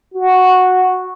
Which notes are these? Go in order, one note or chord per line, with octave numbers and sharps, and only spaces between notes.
F#4